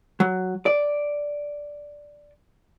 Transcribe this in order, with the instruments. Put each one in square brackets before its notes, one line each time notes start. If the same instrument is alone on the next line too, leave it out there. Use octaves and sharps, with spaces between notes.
[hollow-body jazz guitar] F#3
D5